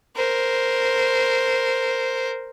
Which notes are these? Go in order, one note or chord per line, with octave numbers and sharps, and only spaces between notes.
A#4 C5